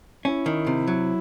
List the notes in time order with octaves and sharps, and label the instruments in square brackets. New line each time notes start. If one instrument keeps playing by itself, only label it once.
[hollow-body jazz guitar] C#4 [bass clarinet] E4
[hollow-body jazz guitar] D#3
C3
F#3